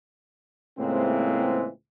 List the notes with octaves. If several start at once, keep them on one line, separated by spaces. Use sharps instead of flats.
C#2 A2 E3 G#3 A#3 C4